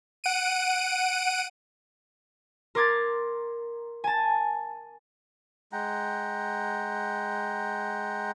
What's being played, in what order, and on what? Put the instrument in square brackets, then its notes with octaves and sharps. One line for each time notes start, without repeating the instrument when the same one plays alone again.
[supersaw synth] F#5 D7 D#7
[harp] A#4 C6 D6 G#6 A6
G#5 A5
[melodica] G#3 F#5 G5 A#5